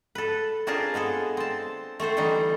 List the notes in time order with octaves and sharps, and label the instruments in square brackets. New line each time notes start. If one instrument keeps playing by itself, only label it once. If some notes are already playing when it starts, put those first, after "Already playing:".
[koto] A4 B4
C4 D4 F4 G#4 A#4 A5
G#3 B3 G#4 A4
C4 A5
A3 C4 A4 C5
D3 E3 G3 D4 D#4